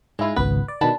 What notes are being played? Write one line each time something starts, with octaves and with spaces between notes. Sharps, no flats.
G#2 G#3 E4 F4
G#1 C#2 B3 B4
D5
B2 D#3 D4 A5 B5